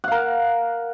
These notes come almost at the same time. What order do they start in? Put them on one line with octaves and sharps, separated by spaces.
F#5 F5 A#4